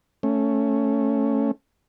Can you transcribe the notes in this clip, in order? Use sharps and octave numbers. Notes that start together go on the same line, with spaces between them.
A3 C#4